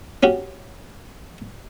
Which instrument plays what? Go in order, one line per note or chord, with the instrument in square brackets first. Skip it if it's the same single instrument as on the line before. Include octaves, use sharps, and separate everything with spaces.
[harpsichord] C#4 F#4 G4